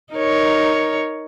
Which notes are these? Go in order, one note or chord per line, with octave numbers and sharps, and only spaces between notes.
D#4 A#4 C#5